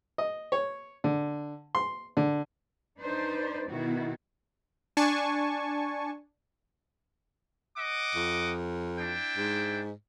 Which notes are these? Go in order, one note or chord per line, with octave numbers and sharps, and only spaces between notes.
D#5
C#5
D3
C6
D3
D4 D#4 B4 C5 D5
B2 D#3 E4 F#4
D4 G#5 A5 C#6
D#5 F#5 D6
F2
D4 E4 G5
G#2